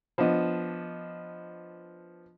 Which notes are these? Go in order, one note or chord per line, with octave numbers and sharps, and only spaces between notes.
F3 B3 D4 D#5